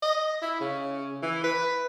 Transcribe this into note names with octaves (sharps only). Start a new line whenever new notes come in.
D#5
E4
C#3
E3
B4